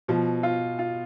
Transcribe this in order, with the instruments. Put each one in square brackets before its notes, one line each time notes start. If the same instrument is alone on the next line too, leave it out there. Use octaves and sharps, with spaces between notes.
[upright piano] B2 [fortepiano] F3
[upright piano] F4
F4